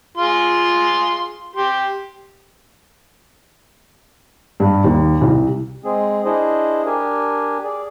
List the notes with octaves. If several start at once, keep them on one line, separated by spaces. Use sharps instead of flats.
F4 G#4 C6
G4 C6
G2
D#2
C2
G#3 C4 G#4
D4 E4 G#4 C5 D#5
D4 G4 A#4 G#5
G#4 D5